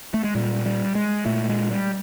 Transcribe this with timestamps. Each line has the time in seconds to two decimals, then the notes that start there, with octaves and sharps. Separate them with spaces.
0.14 A3
0.24 G#3
0.35 A#2 G3
0.66 G3
0.95 G#3
1.26 A#2 A3
1.49 G#3
1.71 G3